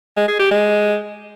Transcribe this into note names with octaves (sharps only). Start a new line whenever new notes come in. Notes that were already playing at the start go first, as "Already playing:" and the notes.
G#3
G#4
G4
G#3